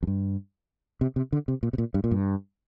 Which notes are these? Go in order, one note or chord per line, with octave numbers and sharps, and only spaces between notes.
F2
G2
C3
C3
D3
C3
A#2
C3
A#2
G2
A#2
G2